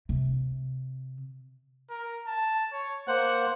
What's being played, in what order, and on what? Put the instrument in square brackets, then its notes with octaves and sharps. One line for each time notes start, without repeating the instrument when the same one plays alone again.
[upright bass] C3
[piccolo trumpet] A#4
A5
C#5
[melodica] A#3 C5 [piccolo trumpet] F#5